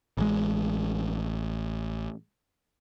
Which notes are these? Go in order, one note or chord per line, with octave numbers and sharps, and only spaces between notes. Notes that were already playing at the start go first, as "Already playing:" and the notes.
A1 G#3